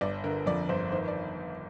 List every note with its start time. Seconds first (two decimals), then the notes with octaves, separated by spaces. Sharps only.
0.01 G1 D5
0.24 D3 A#4
0.46 F2 D5
0.69 G1 C5
0.92 D#3 C5
1.08 D5